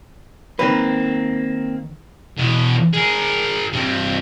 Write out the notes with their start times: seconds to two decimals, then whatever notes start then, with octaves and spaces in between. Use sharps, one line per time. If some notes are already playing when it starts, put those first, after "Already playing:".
0.59 D#3 A#3 C4 B4
2.38 E2 B2
2.94 G#4 A#4
3.73 G2 C4